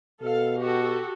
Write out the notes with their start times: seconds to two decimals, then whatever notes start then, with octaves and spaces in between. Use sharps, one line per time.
0.22 B2 A4 F5
0.60 F#4 G4 A4